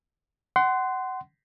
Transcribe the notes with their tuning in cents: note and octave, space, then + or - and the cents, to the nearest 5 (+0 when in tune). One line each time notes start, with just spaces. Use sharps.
F#5 +25 C6 -15